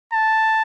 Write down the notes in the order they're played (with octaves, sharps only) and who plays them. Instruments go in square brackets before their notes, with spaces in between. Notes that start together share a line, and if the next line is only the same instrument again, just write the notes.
[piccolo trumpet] A5